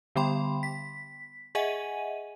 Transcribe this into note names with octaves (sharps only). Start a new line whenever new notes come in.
D3 G3 B3 G5 B5 C6
B6
G#4 D#5 E5 F#5 G#5 D#7